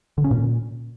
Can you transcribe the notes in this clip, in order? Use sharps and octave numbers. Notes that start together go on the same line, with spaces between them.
D3
C#4
A#2